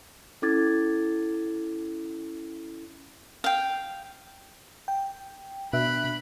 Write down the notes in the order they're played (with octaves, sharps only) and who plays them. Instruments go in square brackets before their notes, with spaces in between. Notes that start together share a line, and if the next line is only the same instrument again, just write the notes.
[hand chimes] C#4 E4 A4 D6 G#6 A6
[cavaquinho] F5 G5
[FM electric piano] G5
[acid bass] B2 [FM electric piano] D4 E5 [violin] B5 [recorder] F#6